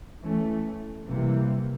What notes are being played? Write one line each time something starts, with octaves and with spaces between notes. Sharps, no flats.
E3 A3 C#4
C3 E3 G3 A#3